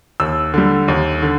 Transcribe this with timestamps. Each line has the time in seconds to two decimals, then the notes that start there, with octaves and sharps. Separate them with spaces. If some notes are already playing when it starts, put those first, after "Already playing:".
0.20 D#2 E6
0.54 D3 G3
0.88 D#2
1.22 D3